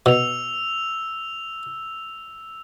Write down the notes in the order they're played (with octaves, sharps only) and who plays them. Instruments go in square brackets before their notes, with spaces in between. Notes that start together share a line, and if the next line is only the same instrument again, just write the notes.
[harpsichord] B2 [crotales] E6 F7